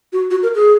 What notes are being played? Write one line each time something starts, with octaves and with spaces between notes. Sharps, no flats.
F#4
F#4
A#4
G#4